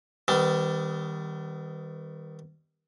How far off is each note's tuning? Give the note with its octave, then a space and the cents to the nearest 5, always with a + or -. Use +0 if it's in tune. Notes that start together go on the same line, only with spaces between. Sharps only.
D#3 +15 G3 +0 B3 +40